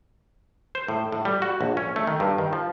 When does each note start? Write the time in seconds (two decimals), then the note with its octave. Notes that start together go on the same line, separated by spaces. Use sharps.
0.75 C5
0.88 A2
1.12 A2
1.25 G3
1.42 F#4
1.61 A#1
1.77 C#4
1.96 A3
2.07 D#3
2.20 G2
2.38 D#3
2.53 F3